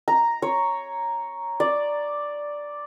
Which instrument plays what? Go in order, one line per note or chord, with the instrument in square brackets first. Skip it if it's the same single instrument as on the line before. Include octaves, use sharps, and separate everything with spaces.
[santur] A#5
C#5
D5